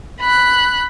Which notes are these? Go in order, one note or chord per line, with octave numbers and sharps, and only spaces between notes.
B5 F#6